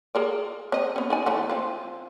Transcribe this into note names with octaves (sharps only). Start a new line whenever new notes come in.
G#4 A#4 D5
C4 D#5
B3 C#4
D#4 D5 G#5
E3 A3 C#4
C4 F4